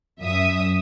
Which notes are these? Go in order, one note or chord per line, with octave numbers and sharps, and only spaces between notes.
F#2 E5 D#6